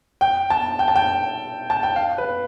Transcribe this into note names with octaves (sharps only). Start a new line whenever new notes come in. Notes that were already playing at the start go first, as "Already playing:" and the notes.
G5
A5
G5
A5
G5
A5
G5
F5
B4